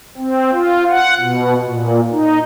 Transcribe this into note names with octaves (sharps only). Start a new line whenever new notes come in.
C4
F4
F#5
B2
A#2
D#4